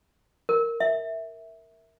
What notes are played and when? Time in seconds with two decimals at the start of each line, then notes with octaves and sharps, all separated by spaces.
0.49 A#4
0.80 E5